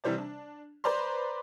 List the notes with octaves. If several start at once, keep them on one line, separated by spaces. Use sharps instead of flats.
C3 E3 G3 C5 D5
D4
B4 C5 D5 A#5 C6